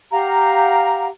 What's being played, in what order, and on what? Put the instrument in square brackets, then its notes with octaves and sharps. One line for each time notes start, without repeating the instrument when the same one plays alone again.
[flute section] G4 F5 F#5 A#5